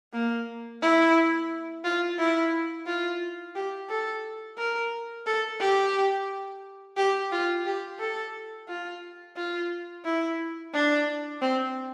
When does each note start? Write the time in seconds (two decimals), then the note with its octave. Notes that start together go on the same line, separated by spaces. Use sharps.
0.13 A#3
0.82 E4
1.84 F4
2.19 E4
2.86 F4
3.55 G4
3.89 A4
4.58 A#4
5.26 A4
5.60 G4
6.97 G4
7.32 F4
7.66 G4
7.99 A4
8.68 F4
9.36 F4
10.05 E4
10.74 D4
11.41 C4